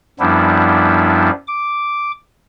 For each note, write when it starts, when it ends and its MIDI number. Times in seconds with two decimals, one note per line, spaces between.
0.20 1.30 42
0.20 1.30 53
0.20 1.30 55
0.20 1.30 59
0.20 1.30 62
0.20 1.30 64
1.47 2.11 86